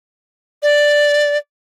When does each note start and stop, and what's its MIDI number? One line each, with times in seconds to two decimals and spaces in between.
0.63 1.37 74